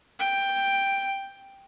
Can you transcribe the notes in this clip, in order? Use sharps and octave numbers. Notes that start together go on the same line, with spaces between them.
G5